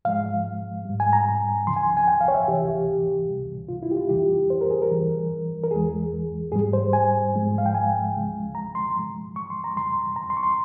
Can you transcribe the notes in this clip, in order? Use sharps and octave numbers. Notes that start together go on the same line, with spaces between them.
G#2 F3 G#3 F5
G#2 G3
G#5
A#5
C#2 C#3 F3 C6
G#5
G#5
G5
F5
C#5
E5
C#2 C3 E3 G4
G4
C#2 C3 G3
F4
E4
G4
F4
F2 C#3 E3 G3 G4
C5
A#4
G#4
A#4
G2 E3 G3
A#4
E2 E3 G#3 G#4
G#2 G3 G#4
C5
G#5
G#2 F3 G#3
F5
G5
G#5
C#2 C#3 F3 G#3
A#5
C6
G2 F3 G#3
C#6
C6
A#5
F2 C#3 G3 C6
A#5
C6
C#6
C6